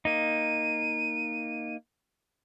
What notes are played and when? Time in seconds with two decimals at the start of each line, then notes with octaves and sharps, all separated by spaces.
0.05 A#3 D#4 D#7